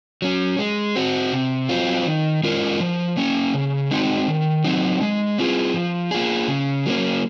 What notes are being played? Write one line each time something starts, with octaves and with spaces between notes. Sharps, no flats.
F#3 C#4
G#3
C4 F#4
C3
F#3 C4 F4
D#3
G#3 C#4 F4 A#4
F3
A#3 C#4
C#3
G#3 C4 D#4 F#4
D#3
F#3 C4 D#4
G#3
C4 F4 G#4
F3
A#3 F4 G#4
C#3
F#3 A#3 C#4